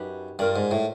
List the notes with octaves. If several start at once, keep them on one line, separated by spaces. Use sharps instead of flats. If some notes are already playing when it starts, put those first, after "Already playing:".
Already playing: F#2 D#4 G4 B4
G2 F4 A#4 D5
G#2
A2